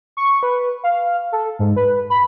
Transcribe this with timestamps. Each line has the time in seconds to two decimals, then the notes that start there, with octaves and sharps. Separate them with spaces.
0.17 C#6
0.43 B4
0.83 F5
1.32 A4
1.59 G#2
1.76 B4
2.10 B5